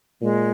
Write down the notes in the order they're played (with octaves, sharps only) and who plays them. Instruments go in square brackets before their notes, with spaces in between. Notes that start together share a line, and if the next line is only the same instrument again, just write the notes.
[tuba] A#2 [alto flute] G#3